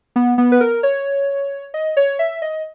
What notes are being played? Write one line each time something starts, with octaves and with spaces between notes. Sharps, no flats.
B3
B3
B4
A#4
C#5
D#5
C#5
E5
D#5